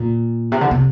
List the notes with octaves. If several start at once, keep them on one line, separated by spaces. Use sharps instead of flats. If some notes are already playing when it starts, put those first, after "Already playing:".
Already playing: A#2
C3
D3
C3